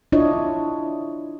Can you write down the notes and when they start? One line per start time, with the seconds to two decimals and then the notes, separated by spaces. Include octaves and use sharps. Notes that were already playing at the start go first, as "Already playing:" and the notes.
0.12 D4 E4 F4 C#5 D#5